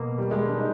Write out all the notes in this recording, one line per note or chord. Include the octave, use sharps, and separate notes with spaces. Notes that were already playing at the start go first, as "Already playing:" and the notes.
Already playing: B2 A#3
G3
G#3
D4
D#4